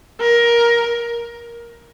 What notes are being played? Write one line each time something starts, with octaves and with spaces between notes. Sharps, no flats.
A#4